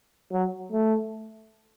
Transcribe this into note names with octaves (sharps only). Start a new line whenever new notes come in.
F#3
A3